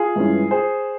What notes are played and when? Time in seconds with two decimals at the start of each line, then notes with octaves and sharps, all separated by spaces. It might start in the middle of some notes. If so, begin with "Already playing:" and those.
Already playing: F4 G#4
0.16 G2 E3 G#3 C#4
0.51 G#4 C5